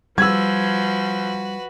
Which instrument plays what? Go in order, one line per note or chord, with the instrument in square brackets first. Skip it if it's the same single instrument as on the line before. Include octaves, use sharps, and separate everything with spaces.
[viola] F3 [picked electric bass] G3 [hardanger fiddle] F#4 B4 [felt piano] E6 G#6